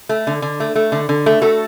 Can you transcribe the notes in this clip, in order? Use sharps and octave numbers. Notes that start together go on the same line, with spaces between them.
A3
D3
D3
A3
A3
D3
D3
A3
A3 F#4 A4